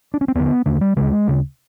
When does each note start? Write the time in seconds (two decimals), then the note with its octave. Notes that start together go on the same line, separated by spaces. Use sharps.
0.14 D4
0.21 C#4
0.28 C4
0.35 D#2 D3 B3
0.66 D#2 D3 A3
0.81 G3
0.97 D2 C#3 G#3
1.27 D2 C#3